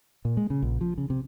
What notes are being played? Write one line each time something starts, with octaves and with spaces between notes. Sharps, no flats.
A#2
G#3
C#3
A#1
F3
C#3
C3